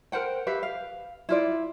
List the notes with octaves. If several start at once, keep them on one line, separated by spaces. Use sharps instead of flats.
A#4 C5 F#5 G5
G4 B4 E5 F5
F5
E4 F4 D5